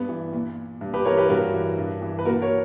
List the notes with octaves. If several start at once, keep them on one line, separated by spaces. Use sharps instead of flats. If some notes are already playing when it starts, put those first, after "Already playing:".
Already playing: G2 B3
E3
A#2
G2
G4 B4
E3 A#4 C#5
G4 B4
G2 F#4 A#4
E3
G2
E3
B4
A#2 F#4 A#4
A#4 C#5